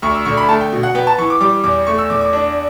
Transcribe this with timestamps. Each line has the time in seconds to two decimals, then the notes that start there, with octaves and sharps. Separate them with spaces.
0.02 D2 C#6
0.15 E6
0.25 D3 C#6
0.37 B5
0.49 A3 A5
0.61 G5
0.73 B2
0.83 F#5
0.95 B3 G5
1.07 A5
1.18 E3 C#6
1.30 D6
1.40 G3 D6
1.64 E2 D6
1.87 A3 C#6
1.98 E6
2.10 E2 D6
2.21 D6
2.33 D4